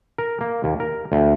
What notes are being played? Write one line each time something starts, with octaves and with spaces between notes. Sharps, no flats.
A#4
A#3
D#2
A#4
D2